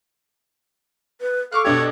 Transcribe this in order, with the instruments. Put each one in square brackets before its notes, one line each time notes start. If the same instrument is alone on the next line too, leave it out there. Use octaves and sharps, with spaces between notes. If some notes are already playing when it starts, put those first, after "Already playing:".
[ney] B4
[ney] A4 [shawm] F5 [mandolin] C#6 D6 F#6
[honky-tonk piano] B2 D4 G4 [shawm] C#5